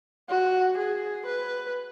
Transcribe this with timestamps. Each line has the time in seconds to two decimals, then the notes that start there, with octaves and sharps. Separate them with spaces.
0.29 F#4
0.78 G#4
1.27 B4